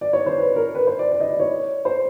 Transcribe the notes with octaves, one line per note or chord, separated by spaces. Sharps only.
D5
C#5
C5
B4
A#4
B4
C5
D5
D5
D#5
D5
C#5
C5